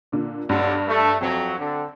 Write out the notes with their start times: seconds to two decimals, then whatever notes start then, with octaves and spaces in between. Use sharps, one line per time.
0.12 A#2 D3
0.49 B1 G2 D3
0.88 A3
1.21 F2 F#3 C4
1.58 D3